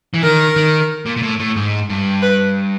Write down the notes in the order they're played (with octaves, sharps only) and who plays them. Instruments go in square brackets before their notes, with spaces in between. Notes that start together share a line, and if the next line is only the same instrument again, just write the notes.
[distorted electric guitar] E3
[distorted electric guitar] D#3 [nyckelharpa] A#4
[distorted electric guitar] D#3
A#2
A#2
A2
A2
G#2
G2
[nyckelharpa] B4